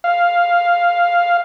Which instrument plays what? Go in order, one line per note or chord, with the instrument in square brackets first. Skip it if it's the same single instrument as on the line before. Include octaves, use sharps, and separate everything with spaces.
[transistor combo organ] F5